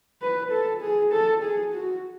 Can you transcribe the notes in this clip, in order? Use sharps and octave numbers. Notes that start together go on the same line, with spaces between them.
B4
A4
G#4
A4
G#4
F#4